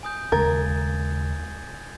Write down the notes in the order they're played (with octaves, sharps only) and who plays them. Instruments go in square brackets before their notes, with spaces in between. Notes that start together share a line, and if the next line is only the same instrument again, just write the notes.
[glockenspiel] G#5 D#6 G6
[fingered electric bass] D#2 C#3 G#3 [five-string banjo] A#4 [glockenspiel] G#6 A6